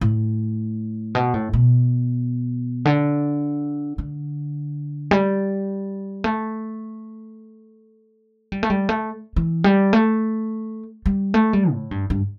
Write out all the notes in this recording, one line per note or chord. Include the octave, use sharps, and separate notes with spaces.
A2
B2
A2
B2
D3
D3
G3
A3
G3
A3
G3
A3
E3
G3
A3
G3
A3
G3
A2
G2
G2